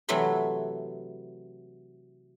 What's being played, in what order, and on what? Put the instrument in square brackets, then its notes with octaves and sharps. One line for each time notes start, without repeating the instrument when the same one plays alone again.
[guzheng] C3 E3 F#3 A3 E5 C6